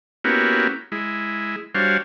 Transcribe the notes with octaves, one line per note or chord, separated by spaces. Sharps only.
A#3 B3 C#4 E4 F#4 G4
G#3 E4
G3 D4 F#4 C5 C#5 F5